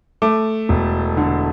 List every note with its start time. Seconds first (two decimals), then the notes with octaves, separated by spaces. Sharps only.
0.22 A3 D6
0.69 E1
1.17 D3